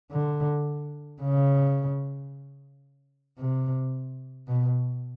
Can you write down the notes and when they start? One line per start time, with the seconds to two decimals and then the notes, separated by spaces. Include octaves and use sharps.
0.12 D3
1.22 C#3
3.39 C3
4.48 B2